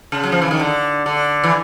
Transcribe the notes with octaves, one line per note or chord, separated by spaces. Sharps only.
C#3
F#3
F3
E3
D#3
D3
D3
E3